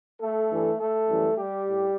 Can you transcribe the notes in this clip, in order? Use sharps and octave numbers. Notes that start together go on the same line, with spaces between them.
A3 A4
G2 E3 G3
A3 A4
F#2 E3 G3
G3 G4
A2